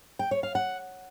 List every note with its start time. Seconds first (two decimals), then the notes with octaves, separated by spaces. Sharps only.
0.19 G5
0.31 C#5
0.43 F5
0.55 F#5